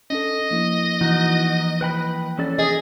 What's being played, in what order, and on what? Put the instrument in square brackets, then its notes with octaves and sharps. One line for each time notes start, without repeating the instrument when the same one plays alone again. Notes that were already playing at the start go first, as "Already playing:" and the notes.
[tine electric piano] C#4 D4 A4 [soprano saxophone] D#5
[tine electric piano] F3 A#3 E4
[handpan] E3 [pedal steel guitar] D#4 F#4
[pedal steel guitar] B4 G5 B5
C#4 A4 D5
[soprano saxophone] G#4 [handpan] D#5